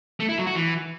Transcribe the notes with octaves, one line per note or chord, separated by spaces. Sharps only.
A3
E4
F#3
F#4
E3